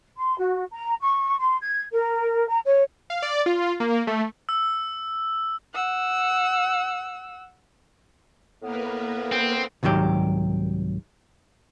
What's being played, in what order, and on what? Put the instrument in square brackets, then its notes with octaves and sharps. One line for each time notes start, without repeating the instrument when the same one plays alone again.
[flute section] C6
F#4
A#5
C#6
C6
G#6
A#4
A#5
C#5
[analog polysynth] F5
D5
F4
A#3
A3
[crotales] E6
[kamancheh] F#5 E6
[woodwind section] A2 B3 [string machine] A#3 A#4 B4
[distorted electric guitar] C4
[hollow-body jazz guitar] C2 G#2 D#3 F#3 G4